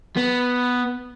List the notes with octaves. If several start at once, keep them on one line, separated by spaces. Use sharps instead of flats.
B3